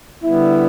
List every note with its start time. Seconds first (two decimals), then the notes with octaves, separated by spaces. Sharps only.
0.23 D3 G3 B3 E4